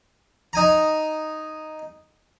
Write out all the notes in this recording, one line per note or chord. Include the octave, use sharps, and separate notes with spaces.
D#4 G#5 A#5